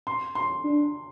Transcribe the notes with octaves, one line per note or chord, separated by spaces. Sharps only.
C6
C6
D4